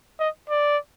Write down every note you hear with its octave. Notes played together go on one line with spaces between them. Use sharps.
D#5
D5